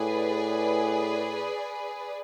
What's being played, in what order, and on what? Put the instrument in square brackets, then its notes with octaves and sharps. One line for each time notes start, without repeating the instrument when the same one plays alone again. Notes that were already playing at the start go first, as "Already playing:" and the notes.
Already playing: [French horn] A2 [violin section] G#4 B4 D5